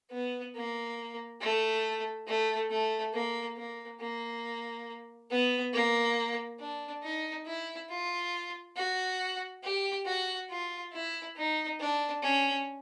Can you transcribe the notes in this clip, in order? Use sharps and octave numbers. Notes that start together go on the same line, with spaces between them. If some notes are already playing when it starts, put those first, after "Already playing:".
B3
A#3
A3
A3
A3
A#3
A#3
A#3
B3
A#3
D4
D#4
E4
F4
F#4
G4
F#4
F4
E4
D#4
D4
C#4